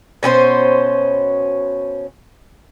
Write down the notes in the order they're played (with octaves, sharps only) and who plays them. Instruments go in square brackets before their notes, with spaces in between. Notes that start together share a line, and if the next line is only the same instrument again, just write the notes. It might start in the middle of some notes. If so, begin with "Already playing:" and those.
[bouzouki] B2 C#4 G4 C5